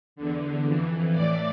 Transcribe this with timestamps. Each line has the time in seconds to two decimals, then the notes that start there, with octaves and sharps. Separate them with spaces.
0.16 E2 D3
0.64 F2 E3
1.13 A2 E3 D5